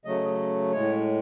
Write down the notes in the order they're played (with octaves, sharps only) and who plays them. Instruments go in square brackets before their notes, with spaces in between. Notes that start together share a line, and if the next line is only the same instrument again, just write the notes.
[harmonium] C#3 F#3 A3 D#5
A2 G#3 C#5